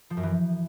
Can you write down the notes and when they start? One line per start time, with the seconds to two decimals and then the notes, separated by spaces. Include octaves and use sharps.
0.10 F3
0.17 F#2
0.23 E3